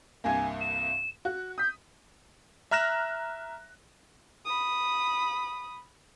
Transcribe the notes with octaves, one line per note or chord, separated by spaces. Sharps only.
C2 G2 A#3 G#5
E7
F#4 F#6
D#6 G6 B6
E5 A#5 F6 F#6 A#6 E7
B5 D#6